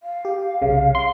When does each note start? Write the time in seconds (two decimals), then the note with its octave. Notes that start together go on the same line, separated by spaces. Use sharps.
0.03 F5
0.25 G4
0.62 C2 C#3
0.95 C6